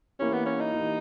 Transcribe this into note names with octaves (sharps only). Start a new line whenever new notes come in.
E3 A#3 C#4 E4 G4
B3
C#4
D#4
E3 A#3 E4 G4